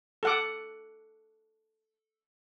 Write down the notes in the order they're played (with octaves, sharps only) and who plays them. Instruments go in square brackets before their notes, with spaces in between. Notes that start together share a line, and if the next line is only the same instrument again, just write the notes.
[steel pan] A4 F#5 D6